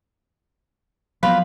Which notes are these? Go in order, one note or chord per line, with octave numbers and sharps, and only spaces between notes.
F3 F#3 B3 F4 B4 B5